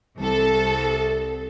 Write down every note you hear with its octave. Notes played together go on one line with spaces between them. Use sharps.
C2 A4